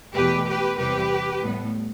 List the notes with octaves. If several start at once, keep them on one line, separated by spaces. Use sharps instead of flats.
E2 B2 A3 G4 B4
G4 B4
E2 C3 G3 G4 B4
A2 G3 B3